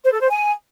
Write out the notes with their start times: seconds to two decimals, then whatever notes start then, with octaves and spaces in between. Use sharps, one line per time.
0.04 C5
0.13 A4
0.21 C5
0.30 G#5